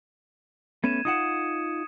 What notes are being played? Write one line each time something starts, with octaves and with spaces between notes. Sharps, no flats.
A3 B3 C#4 G#6 D#7 E7
D#4 F4 F#5 D#6 C#7 E7